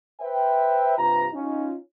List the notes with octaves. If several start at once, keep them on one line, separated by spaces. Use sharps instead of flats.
B4 C5 E5 G5
G2 C3 F4 B4 A#5
C#4 D#4 F4